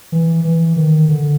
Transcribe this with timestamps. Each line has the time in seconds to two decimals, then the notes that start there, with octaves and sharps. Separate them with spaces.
0.12 E3
0.45 E3
0.76 D#3
1.09 D3